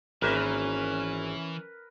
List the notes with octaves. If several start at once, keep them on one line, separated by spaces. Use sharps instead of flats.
G#1 E3 A#3 C#4 A#4 B4 E5